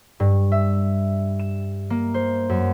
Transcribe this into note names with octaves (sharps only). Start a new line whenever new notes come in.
G2
E5
E7
A#3
C5
F#2